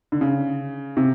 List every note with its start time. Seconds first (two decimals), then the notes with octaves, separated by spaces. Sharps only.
0.12 D3
0.21 C#3
0.97 C3